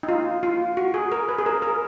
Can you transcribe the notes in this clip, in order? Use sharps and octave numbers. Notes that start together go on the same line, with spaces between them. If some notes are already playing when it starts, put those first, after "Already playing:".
D#4
F4
F4
F#4
G#4
A#4
B4
G#4
A#4
A#4